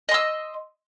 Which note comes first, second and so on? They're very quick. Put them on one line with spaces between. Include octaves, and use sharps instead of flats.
D#5 C6 E6